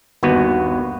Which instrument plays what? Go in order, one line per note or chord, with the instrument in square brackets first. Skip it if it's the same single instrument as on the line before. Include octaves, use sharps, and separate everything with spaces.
[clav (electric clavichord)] G1 D#2 B3 F#4 B4